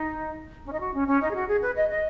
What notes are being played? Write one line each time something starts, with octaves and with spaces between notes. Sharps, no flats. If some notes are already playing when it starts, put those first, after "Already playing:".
Already playing: D#4
C#4
D#4
F#4
C#4
C#4
D#4
G#4
F#4
G#4
B4
D#5
D#5